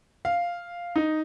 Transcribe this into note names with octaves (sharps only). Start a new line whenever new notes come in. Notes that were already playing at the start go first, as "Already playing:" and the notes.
F5
D#4